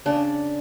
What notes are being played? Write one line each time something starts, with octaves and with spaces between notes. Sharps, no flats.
C#3 D4